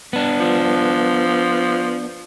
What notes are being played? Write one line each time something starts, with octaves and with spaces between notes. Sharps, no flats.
B3 D4
F3